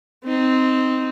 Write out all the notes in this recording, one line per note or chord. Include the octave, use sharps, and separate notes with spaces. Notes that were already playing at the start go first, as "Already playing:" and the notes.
C4 D#4